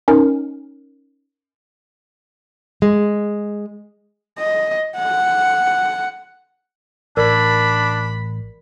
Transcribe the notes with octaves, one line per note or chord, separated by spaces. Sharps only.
C#4 D#4 A#4
G#3
D#5
F#5
A1 D4 A#4 D5 B5